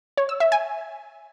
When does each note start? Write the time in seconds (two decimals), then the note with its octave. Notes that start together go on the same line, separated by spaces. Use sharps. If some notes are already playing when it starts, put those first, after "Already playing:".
0.17 C#5
0.29 E6
0.40 E5
0.52 G#5